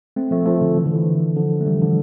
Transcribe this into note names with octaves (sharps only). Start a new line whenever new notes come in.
A3 C4
F3 A3
F3 A3
D3
E3
D3
E3
D3 F3
A3
E3 G3
D3 F3